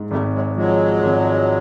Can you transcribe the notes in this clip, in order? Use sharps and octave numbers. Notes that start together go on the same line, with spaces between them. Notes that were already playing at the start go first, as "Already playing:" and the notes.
Already playing: G#2
G#1 G3 A3
F#3 G#3
F3 F#3 G#3
G#1